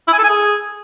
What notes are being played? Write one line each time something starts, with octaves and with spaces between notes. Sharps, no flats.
E4
G#5
A4
G#5
G#4